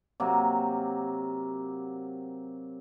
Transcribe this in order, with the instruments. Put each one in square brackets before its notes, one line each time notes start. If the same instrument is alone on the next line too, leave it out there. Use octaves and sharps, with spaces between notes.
[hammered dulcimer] C3 F#3 A#3